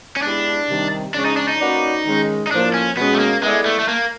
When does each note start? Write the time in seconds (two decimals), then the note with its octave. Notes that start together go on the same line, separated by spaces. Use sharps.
0.16 C#4
0.22 G#3 B3 D4 E4 G4
0.69 C3 D#3 G3
1.14 C#3 F3 G#3 C#4 D4
1.25 D#4
1.37 D4
1.48 D#4
1.59 A#3 C#4 F#4 B4 D5
2.05 D#3 G#3 C#4
2.47 D#4
2.51 A2 F3 A#3 D4
2.74 C#4
2.96 B2 G#3 B3 C#4
3.14 A3
3.20 A#3
3.42 G#3 B3 E4 A4 D5
3.66 A3
3.79 A3
3.88 A#3